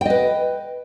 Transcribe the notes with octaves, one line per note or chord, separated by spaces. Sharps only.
B4 D#5 G5